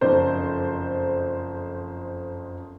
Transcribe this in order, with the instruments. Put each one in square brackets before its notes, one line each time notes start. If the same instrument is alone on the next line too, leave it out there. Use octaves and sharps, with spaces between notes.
[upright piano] F#1 F2 D#4 C5 D5